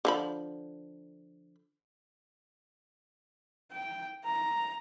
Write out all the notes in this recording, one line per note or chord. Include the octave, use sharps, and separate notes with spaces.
D3 F3 B5
G5
A#5